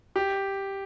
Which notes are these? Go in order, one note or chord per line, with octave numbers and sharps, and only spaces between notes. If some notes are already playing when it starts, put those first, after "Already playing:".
G4